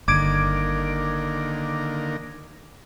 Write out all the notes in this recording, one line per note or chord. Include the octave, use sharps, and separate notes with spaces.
G1 D3 D#3 A#3 D6 G#6 D7